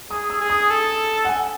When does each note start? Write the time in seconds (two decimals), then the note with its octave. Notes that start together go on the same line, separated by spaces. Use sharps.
0.11 G#4 D#6
0.30 E6
0.41 G#4
0.50 D#6
0.70 A4
1.25 F#5
1.29 G#5